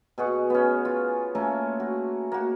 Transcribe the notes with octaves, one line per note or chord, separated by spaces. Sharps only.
B2 G#4 F#5 C#6
B3 C#4
F4
A3 A#3 C#4
F#4
A#3 F#4